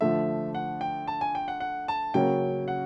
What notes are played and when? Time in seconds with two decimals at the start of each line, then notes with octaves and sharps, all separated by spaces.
0.01 D3 F3 A3 E5
0.55 F#5
0.81 G5
1.08 A5
1.21 G#5
1.35 G5
1.48 F#5
1.60 F#5
1.88 A5
2.14 C#3 F#3 A#3 C#4 G5
2.68 F#5